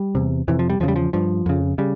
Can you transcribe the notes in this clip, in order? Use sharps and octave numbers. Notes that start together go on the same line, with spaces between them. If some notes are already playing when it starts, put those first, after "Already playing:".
Already playing: G3
E2 C3
F2 C3 E3
F3
G3
E2 C#3 F3
G3
F3
G2 F3
F2 C#3
C#3 G3